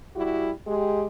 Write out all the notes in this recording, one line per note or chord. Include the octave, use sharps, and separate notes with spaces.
G3 E4 F#4 G4
G#3 G4